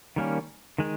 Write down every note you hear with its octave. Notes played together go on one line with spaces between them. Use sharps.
D#3 G3 A#3 C#4
D#3 G#3